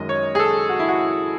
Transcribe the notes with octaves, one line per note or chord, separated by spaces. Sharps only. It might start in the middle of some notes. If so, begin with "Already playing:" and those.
Already playing: F#2 D#3 G#3 D#5
C#5
G#4
A4
F#4
E4
F#4